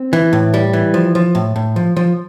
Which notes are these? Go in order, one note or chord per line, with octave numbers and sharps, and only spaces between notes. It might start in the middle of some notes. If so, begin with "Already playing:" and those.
Already playing: C4
E3
A2
G3
E3
F3
F3
A2
A2
F3
F3